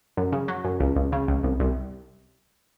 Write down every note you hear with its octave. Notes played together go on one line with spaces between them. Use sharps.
F#2
C#3
F#3
F#2
C#2
C#2
C#3
C#2
C2
C2